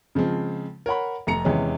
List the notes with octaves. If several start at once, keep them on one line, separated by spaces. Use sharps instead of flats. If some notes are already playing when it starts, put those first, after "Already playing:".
C#3 F3 G#3 C4
A#4 C#5 F#5 B5
F1 A3 A#5 C#7
E2 C3 G#3 C#4